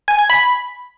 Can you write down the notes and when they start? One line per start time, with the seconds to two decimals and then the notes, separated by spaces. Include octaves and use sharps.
0.08 G#5
0.19 G#6
0.30 B5